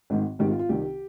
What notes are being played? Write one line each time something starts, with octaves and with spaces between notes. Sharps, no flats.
G#1 G#2 D#3
G#1 G#2 D#3 G4
F4
F4
C2 C3 D#3 G4